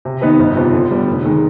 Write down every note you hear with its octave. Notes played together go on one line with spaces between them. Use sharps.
C3
D#3 B3 D#4 B4
G1
F2 C3 F3 B3
D3
G3 B3
F1
D#3 G#3